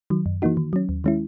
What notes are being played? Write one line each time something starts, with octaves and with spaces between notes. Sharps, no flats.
D#3 F#3
F#2
E3 A#3 D#4 F#4
D#3
F#3 C#4
D#2
D#3 G#3 C#4 E4